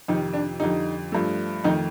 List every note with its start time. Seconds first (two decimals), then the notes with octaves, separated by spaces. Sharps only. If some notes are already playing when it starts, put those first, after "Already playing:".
0.08 F2 C3 D#3 D#4
0.34 D4
0.60 F2 D3 G3 D#4
1.12 G2 F3 A3
1.64 F2 D#3 A3 D#4